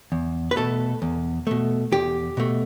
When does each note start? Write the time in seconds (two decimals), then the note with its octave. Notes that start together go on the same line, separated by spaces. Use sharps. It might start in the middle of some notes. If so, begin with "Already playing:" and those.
0.12 E2
0.51 B4
0.56 B2 A3 A4
1.02 E2
1.47 B2 A3
1.92 E2 G4
2.37 B2 A3